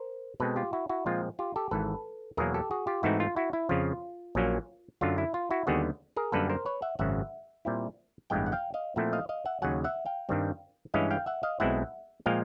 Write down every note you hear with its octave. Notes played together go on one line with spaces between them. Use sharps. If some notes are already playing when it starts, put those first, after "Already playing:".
Already playing: A#4 C5
B2 G#3 C4 A4 B4
F4 G4
E4 F#4
E4 F#4
A#2 F3 G#3 C4 F4
F4 G4
G4 A4
G#1 G#2 E3 A4 B4
E2 B2 F#3 A#3 G#4 A#4
G4 A4
F#4 G#4
F4 G4
G#2 E3 A3 C4 D#4 E4 F#4
F4
E4 F#4
E4
F2 C#3 F3 F4
A#1 A#2 F#3 A#3 C#4
F#2 D3 F#3 F4
E4
F4
E4 F#4
D#2 D3 G3 B3 F#4 G#4
G#4 A#4
F#2 D3 G3 A#3 A4 B4
A#4 C5
B4 C#5
E5 F#5
G#1 F#2 C#3 E5 F#5
A#2 G3 C4 E4
A1 G2 E3 G#3 B3 F5 G5
F#5
F5 G5
D#5 F5
A#2 F3 A3 C4 E4 E5 F#5
D#5 F5
D#5 F5
E5 F#5
D#2 C#3 F#3 F#5 G#5
E5 F#5
F5 G5
G2 D#3 G3 C4
G2 E3 G#3 C#4 E4 D#5 F5
F5 G5
E5 F#5
D#5 F5
B1 B2 G#3 C4 E4 E5 F#5
A#2 F3 G#3 F5 G5